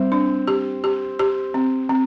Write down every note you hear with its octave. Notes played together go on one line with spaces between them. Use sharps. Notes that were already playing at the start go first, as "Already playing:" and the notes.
Already playing: G3 C4
D4
G4
G4
G4
C4
C4